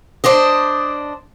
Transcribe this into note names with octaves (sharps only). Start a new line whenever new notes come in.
D4 C5 D5 D#5